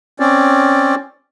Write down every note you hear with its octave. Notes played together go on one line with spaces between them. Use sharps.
C4 C#4 D5